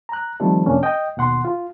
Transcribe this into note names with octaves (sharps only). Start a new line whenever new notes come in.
A#5 F#6
D#3 F3 G3 A3 C4 A4
F2 C3 A#3 C#4 D4
D#5 G5
D#2 B2 F#5 C6
F4